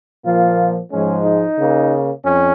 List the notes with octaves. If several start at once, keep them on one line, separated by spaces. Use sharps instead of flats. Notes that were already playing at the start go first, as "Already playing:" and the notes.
A#2 F3 A#3 F4
G#2 F3 G#3 C#4
D#4
C#3 A#3
F2 C#4